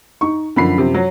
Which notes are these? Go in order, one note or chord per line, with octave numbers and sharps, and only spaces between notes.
D#4 C#6
F#2 D3 F3 B5 C7
C3
F#3